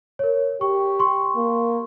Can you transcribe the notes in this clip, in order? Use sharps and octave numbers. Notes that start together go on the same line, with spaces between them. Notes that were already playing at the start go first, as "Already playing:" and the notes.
A#4 C#5
G4 C#6
C6 C#6
A#3